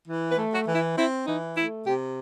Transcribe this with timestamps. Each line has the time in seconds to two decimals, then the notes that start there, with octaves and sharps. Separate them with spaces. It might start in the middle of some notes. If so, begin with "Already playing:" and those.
0.06 E3
0.28 B4
0.36 A3
0.51 F#4
0.65 E3
0.73 E4
0.95 C4 E4
1.25 E3 D#4
1.54 A3 E4
1.84 C3 G4